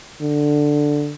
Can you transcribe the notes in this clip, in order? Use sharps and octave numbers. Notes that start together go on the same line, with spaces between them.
D3